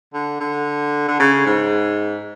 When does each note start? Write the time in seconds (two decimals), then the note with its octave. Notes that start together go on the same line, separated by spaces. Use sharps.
0.14 D3
0.40 D3
1.08 D3
1.20 C#3
1.46 G#2